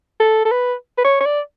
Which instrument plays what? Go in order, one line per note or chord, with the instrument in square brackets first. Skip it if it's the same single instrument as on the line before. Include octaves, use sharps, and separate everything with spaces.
[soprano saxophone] A4
A4
B4
B4
C#5
C#5
D5